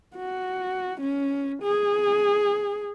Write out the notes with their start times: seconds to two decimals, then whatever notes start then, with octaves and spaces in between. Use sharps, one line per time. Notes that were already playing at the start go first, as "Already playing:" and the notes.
0.16 F#4
1.01 C#4
1.63 G#4